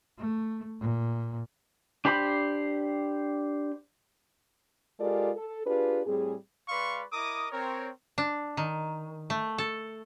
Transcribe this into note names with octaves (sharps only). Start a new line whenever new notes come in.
A3
A#2
D4 G4 C5 B5
G#3 F4 G4 A4 A#4 D5
A4
D4 F4 G4 G#4 B4
A2 G3 C4 G#4
G#3 B4 D5 F5 C6 C#6
E4 A#4 D#5 D6 D#6
C4 A#4 C#5
D4
D#3
A3
A4